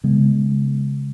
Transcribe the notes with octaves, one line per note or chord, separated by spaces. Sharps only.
C#3 G#3 B3